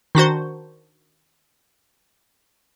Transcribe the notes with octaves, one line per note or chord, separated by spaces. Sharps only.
D#3 D4 F#4 C5